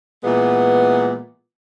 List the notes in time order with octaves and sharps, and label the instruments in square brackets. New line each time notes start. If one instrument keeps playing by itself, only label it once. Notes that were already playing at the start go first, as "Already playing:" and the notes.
[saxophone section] A#2 E3 G#3 B3